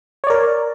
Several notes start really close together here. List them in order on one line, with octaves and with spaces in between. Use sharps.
C#5 D5 A#4